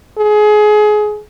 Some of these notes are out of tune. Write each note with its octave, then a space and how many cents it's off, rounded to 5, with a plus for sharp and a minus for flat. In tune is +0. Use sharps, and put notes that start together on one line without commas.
G#4 +25